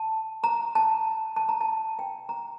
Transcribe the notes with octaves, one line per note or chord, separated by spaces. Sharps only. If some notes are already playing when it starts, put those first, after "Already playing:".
Already playing: A5
A#5
A5
A5
A#5
A5
G5
A#5